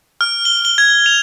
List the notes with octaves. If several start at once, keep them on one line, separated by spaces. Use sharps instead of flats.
F6
G7
G7
G#6
F7